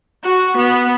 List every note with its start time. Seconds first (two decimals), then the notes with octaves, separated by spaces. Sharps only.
0.23 F#4
0.57 B3